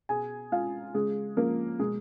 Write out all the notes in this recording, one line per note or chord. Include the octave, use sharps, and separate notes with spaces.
B2 G#4 G#5
G#3 F4 F5
C#3 G#3 G#4
F3 G#3 A#3 A#4
B2 G#3 G#4